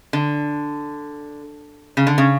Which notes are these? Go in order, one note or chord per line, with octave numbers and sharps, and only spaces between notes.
D3
C#3
D3
C#3